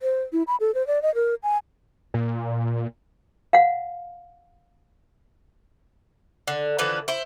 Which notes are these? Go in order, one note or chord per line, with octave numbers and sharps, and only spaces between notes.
C5
E4
B5
A4
C5
D5
D#5
A#4
G#5
A#2
F5 F#5
D3
D3 E3 F3 B4
E4 C5